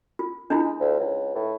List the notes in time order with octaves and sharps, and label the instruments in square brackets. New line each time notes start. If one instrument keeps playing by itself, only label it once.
[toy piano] F4
[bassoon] G#3 [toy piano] D4 E4 F4
[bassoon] D2
C#2
A2